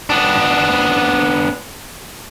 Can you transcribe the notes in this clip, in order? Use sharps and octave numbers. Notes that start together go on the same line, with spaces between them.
B3 D4